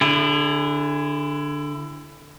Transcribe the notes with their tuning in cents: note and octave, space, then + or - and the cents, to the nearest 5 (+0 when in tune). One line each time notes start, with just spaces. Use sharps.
D3 +0 E4 +20 G#4 -35